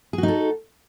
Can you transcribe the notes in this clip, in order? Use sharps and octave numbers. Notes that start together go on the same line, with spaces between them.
D#4 F#4 G#4 A4